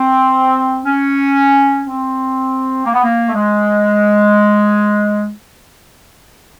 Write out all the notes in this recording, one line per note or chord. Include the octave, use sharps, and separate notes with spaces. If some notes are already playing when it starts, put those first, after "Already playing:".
Already playing: C4
C#4
C4
A#3
B3
A#3
A3
G#3